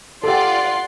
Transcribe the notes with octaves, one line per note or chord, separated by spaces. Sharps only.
F4 G4 A4 D5 F#5 C6